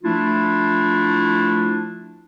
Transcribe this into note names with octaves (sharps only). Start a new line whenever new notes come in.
F3 A3 D4 E4 F4